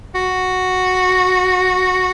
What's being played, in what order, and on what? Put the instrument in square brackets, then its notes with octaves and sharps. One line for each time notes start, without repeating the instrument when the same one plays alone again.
[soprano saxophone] F#4